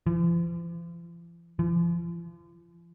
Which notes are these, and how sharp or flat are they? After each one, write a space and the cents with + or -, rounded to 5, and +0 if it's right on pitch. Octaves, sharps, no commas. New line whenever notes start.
F3 -45
F3 -40